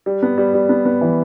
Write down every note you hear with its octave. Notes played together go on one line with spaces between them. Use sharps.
G3
B3
G3
G3
B3
B3
E3